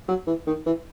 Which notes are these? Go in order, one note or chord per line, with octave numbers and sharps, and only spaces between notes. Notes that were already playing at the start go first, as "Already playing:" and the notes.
F#3
E3
D#3
E3